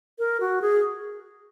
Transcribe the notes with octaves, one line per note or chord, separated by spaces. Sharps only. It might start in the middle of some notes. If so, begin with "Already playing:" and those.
A#4
F#4
G#4